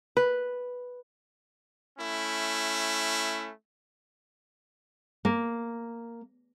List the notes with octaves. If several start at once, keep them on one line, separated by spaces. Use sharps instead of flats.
B4
A3 C#4 E4
A#3